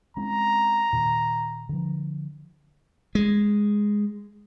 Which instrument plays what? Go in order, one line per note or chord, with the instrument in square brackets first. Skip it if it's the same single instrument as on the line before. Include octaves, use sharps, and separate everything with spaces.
[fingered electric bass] G#3 C4 C#4 [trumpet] A#5
[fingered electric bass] A#2 D#3
D3 F3
[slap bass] G#3